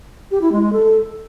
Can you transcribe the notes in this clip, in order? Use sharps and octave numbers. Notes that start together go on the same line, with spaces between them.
G4
E4
G#3
G#3
A4